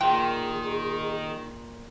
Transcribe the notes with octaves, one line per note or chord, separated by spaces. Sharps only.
A#2 D#3 G#4 G5